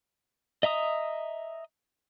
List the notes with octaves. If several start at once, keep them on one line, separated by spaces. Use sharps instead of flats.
D#5 E5 A#5 D#6